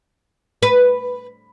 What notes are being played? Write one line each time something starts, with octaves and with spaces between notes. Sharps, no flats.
B4